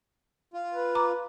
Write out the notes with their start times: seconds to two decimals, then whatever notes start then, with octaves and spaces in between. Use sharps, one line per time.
0.54 F4
0.74 B4
0.95 A#5 D6